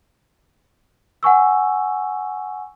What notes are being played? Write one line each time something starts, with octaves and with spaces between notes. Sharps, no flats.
F#5 G#5 C#6 E6